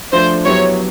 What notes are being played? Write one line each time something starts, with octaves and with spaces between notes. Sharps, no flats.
F3 A3 D4 C5
F#3 B3 E4 G4 C#5